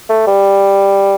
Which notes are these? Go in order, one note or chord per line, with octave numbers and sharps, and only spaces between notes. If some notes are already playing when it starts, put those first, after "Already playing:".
A3
G3